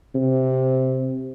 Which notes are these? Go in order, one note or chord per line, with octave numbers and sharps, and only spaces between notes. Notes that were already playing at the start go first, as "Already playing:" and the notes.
C3